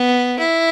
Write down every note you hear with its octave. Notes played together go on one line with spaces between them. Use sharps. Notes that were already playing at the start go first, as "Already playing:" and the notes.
Already playing: B3
E4